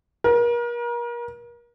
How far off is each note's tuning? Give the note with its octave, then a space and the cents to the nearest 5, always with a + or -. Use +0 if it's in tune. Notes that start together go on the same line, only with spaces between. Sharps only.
A#4 +35